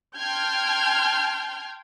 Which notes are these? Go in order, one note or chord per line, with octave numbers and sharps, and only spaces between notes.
G5 A5 C6 F6 G6 G#6